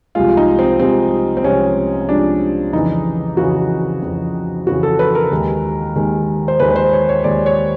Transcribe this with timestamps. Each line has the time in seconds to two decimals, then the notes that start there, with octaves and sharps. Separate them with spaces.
0.15 C2 C3 F3 G#3 F4
0.37 D#4
0.59 C4
0.80 C2 C3 F3 G#3 C4
1.37 C4
1.44 C2 C3 F3 G#3 C#4
2.08 C2 C3 F3 G#3 D4
2.73 F2 C#3 E3 D#4
3.37 F2 C#3 E3 F#4
4.02 F2 C#3 E3
4.67 F2 C#3 E3 F#4
4.83 A4
4.99 B4
5.15 A#4
5.31 D#2 D#3 G#3
5.95 D#2 D#3 G#3
6.48 C5
6.60 D#2 D#3 G#3 B4
6.70 B4
6.76 C5
6.93 C#5
7.09 C#5
7.24 D#2 D#3 G#3 D5
7.46 C#5